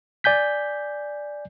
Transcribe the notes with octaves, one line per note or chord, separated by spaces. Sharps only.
D5 G#5 G6 B6